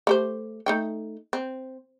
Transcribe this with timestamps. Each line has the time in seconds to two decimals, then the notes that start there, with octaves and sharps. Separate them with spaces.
0.07 A3 G4 C5
0.66 A3 D#4 G5
1.33 C4